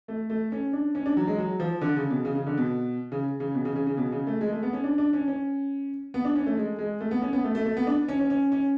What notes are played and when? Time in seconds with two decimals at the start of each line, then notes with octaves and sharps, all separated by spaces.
0.08 A3
0.30 A3
0.52 C#4
0.73 D4
0.95 C#4
1.06 D4
1.17 F#3
1.27 G#3
1.38 F#3
1.60 F3
1.81 D3
1.96 C#3
2.10 B2
2.25 C#3
2.35 C#3
2.47 D3
2.57 B2
3.12 C#3
3.40 C#3
3.55 B2
3.65 C#3
3.76 C#3
3.87 C#3
3.97 B2
4.12 C#3
4.27 A3
4.41 G#3
4.52 A3
4.63 B3
4.73 C#4
4.84 D4
4.98 D4
5.13 C#4
5.28 C#4
6.14 B3
6.25 D4
6.36 C#4
6.46 A3
6.57 G#3
6.79 G#3
7.00 A3
7.11 B3
7.22 C#4
7.33 B3
7.44 A3
7.55 A3
7.65 A3
7.77 B3
7.87 D4
8.09 C#4
8.19 C#4
8.30 C#4
8.52 C#4